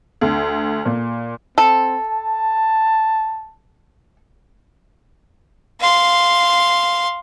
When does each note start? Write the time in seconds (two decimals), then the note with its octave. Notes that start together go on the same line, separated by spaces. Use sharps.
0.21 D2
0.85 A#2
1.58 C4 A4
2.09 A5
5.80 F5 C6